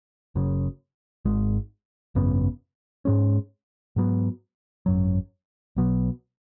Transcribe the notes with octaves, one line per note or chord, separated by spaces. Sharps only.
F#1 F#2 C#3
G#1 G#2 G#3
G#1 F#2 C#3 B3
G#2 G#3 C#4
G#2 F#3 B3
G#1 F#2 F#3
B1 B2 F#3 B3